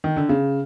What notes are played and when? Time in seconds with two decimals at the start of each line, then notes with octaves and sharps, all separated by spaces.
0.04 D#3
0.16 D3
0.29 C#3